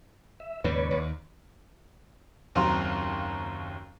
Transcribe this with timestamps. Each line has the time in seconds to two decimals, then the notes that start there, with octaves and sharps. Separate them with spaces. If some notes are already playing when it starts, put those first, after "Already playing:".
0.40 E5
0.64 D#2 G#2 C#3 B4 C#5 D5
0.91 D#2
2.55 F#1 D#2 C4 F5 A#5 C6